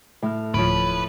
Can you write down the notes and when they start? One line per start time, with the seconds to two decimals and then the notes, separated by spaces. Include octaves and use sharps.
0.22 A2 A4 F6
0.54 D1 F3 B4 C#5 D7